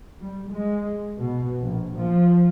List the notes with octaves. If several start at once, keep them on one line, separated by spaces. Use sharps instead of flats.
G3
G#3
B2
A#1
F3